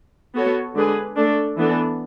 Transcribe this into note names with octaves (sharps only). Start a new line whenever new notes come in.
B3 F#4 A4 C#5
D3 G#3 D4 G#4 B4
A3 D4 A4
E3 B3 D4 A4